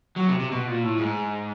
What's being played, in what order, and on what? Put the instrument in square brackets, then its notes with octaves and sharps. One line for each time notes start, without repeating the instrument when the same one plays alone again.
[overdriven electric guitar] F#3
C3
C3
B2
A#2
A2
G#2